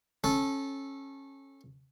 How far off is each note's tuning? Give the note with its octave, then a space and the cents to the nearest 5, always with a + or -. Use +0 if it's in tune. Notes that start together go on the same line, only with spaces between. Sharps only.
C#4 -20 A4 -15